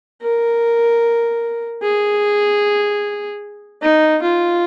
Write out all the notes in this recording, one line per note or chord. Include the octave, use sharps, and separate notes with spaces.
A#4
G#4
D#4
F4